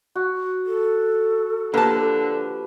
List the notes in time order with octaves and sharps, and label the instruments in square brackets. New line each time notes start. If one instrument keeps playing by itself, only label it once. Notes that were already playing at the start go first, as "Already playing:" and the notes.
[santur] F#4
[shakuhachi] A4
[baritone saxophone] D3 [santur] F3 G4 B4 [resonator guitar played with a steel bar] A#3 A5